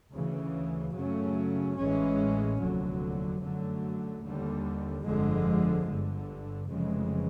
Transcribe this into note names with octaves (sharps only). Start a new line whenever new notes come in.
D2 C#3 E3
F#2 C#3 F#3 A3 C#4
A1 A2 E3 G#3 C#4
F1 D#2 D3 F#3
F#2 D3 F#3 A3
D#2 D3 G3
G1 F2 D3 F3 G#3
G1 G2 D3
F1 F2 C#3 E3 G#3